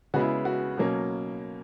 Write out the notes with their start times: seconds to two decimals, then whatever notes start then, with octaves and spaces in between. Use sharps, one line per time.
0.14 C#3 G#3 B3 F#4
0.21 E4
0.45 F#4
0.78 B2 F#3 A#3 C#4